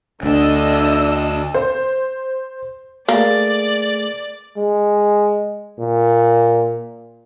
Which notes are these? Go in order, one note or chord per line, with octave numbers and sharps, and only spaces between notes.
D2 D4 D#5 E6
C5
A3 A#3 G#4 D5
G#3
A#2